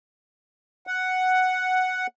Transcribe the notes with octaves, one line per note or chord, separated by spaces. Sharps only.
F#5